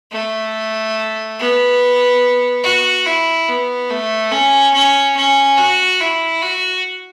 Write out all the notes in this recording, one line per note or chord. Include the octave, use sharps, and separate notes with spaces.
A3
B3
F#4
E4
B3
A3
C#4
C#4
C#4
F#4
E4
F#4